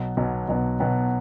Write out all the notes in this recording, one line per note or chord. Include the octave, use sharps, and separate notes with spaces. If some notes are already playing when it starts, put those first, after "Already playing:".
Already playing: B1 B2 F#3 B3
B1 B2 F#3 B3
B1 B2 F#3 B3
B1 B2 F#3 B3